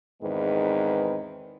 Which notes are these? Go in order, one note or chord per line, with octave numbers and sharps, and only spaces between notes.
E2 G#2 D#3 G#3 C4 B4